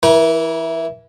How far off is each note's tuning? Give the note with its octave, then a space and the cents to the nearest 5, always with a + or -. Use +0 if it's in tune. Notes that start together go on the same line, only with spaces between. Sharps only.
E3 +0 A#4 +45